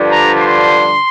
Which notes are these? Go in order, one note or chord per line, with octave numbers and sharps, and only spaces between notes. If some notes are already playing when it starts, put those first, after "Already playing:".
Already playing: G2 D3 F3 D4
A#5
C6